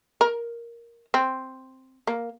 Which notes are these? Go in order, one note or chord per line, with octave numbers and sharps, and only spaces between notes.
A#4
C4
A#3